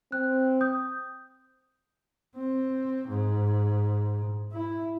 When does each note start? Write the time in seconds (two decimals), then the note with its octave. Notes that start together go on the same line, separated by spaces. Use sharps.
0.12 C4 F#6
0.61 D#6 G6
2.35 C4
3.08 G#2
4.53 E4